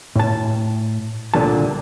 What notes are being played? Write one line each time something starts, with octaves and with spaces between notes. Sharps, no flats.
A2 A5
C2 A#2 D3 E3 A5